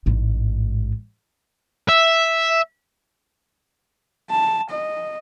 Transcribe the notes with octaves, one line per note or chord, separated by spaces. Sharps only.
A1 G#2
E5
A5
D#5